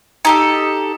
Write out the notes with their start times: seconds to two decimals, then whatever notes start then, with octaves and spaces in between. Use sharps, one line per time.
0.25 D#4 G4 A4